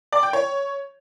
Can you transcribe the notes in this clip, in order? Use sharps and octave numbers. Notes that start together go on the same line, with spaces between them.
D5
G5
C#5